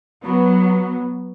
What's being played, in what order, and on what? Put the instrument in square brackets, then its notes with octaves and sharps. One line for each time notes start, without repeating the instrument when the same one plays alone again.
[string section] F#3 B3